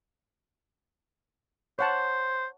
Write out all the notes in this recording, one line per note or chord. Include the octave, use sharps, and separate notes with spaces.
C5 C#5 F#5 A5